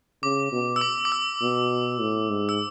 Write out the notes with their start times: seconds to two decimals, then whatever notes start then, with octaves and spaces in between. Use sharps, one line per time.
0.23 C#3 D6
0.52 B2
0.76 E6
0.81 D6
1.05 D6
1.12 E6
1.41 B2
2.01 A2
2.30 G#2
2.49 E6